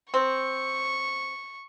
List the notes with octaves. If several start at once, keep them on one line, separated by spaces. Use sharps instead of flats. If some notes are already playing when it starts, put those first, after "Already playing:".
C4 C#6